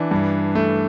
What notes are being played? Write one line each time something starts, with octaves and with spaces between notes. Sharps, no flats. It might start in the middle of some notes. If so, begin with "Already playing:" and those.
Already playing: E3 D4
G2
A3